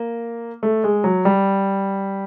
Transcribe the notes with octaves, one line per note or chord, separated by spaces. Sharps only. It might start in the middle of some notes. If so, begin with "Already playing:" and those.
Already playing: A#3
A3
G#3
F#3
G3